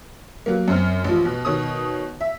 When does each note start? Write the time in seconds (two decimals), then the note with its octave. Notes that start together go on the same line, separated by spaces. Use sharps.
0.46 F#3 A#3
0.68 F#2 C4 F6
1.04 A1 F3
1.25 B2
1.45 B2 D#3 C#5 D#6
2.21 E5